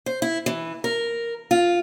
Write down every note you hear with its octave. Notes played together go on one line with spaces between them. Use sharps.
C5
E4
E3
A#4
F4